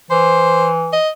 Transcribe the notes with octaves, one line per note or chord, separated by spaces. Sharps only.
E3 C5
D#5